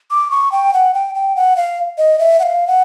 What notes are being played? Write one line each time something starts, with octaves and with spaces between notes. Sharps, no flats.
D6
C#6
G5
F#5
G5
G5
F#5
F5
D#5
E5
F#5
F5
F#5